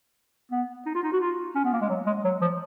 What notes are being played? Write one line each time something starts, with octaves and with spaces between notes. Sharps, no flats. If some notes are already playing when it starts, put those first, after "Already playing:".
B3
D#4
F4
D#4
F#4
F4
C#4
B3
A#3
G#3
F#3
G#3
F#3
F3